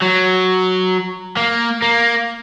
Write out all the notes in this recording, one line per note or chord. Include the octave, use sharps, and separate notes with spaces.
F#3
A#3
A#3